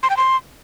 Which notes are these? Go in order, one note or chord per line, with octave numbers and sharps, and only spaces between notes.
C6
G5
C6